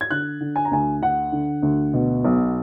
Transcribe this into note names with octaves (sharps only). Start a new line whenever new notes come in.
G#6
D3 F#6
D3
G#5
A#5
D2 G#5
D3 F#5
D3
D2
B2
B1